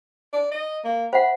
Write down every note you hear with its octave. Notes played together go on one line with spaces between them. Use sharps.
D5
D#5
A#3
C5 E5 F#5 B5